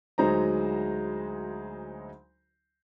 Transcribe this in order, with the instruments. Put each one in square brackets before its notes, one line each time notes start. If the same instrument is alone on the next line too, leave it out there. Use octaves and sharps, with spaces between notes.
[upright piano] D2 F#3 G#3 D#4 C5 A#5